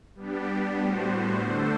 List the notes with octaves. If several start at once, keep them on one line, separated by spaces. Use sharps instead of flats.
G3 B3 D4 G4
A2 G3 B3 F#4 C5
D3 A3 D4 A4 C5